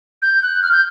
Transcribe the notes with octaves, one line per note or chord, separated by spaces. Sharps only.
G6
F#6
F6
G6